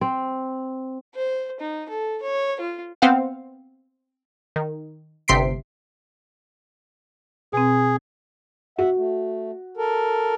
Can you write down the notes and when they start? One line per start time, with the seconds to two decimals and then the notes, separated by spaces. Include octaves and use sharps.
0.01 C4
1.15 C5
1.60 D#4
1.89 A4
2.22 C#5
2.60 F4
3.02 B3 C4 F5 F#5
4.56 D#3
5.28 G1 C3 C6 B6 C7 D7
7.53 B2 C4 G#4
8.78 F#4 E5 F#5
8.97 A3
9.77 A4 A#4